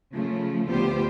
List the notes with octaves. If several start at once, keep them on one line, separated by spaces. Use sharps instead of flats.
C#3 F3 A3
D2 B3 F4 G4 C5